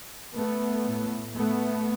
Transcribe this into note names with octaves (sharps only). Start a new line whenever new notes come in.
A3 B3
A2
A3 B3